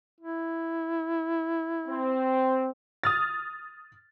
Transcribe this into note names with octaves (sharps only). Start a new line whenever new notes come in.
E4
C4
D#6 F6 A6